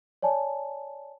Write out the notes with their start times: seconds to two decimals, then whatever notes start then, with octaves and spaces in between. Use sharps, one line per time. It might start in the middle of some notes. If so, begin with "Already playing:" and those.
0.22 C#5 D5 G#5 A5